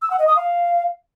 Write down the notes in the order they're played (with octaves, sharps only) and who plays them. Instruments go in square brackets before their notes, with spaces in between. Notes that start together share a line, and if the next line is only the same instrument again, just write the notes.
[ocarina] E6
F#5
D#5
D#6
F5